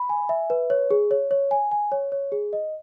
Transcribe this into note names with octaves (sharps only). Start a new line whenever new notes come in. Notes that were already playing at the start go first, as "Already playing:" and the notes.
Already playing: B5
G#5
E5
B4
C#5
G#4
C#5
C#5
G#5
G#5
C#5
C#5
G#4
D#5